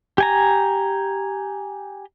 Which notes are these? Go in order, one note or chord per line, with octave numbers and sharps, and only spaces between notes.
G4 G#5 A#5